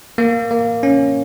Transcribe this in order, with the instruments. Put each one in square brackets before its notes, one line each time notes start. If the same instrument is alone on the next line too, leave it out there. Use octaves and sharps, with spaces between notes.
[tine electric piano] A#3
A#3
C#4